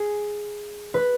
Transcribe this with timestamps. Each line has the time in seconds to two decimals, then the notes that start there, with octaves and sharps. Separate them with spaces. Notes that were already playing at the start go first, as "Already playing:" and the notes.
Already playing: G#4
0.94 B4